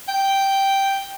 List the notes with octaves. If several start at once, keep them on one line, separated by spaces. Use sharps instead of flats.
G5